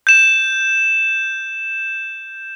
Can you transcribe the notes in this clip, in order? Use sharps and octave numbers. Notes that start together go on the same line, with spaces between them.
G6 E7